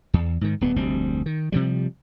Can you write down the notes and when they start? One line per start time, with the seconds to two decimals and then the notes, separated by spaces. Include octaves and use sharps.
0.14 E2
0.41 G#2 D#3
0.61 D1 G2 B3
0.76 F1 D2 G3 C4
1.26 D#3
1.52 C3 F3 G3